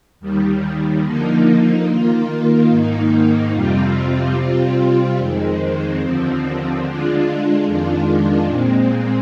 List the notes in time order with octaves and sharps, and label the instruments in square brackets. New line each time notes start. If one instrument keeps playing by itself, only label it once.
[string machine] D#2 D#3 G3
D3 F3 A#3 D#4
D#3 A#3 F4
G#2 D#3 A#3 D#4
F2 C3 G3 C4 F4
C3 G3 C4 F4
F2 D#3 G#3 C4
D#2 D3 F3 C4
D3 G#3 D4 F4
F2 D#3 G#3 D4 F4
A#2 G#3 C4